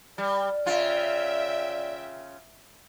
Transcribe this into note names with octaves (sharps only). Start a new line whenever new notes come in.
G3 D5
C#3 F4 E5 G5